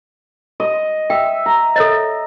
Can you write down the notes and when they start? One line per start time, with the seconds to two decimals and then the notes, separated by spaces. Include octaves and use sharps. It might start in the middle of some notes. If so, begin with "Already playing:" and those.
0.60 D#5
1.10 E5 G5
1.46 A#5
1.76 A4 C#5 D#5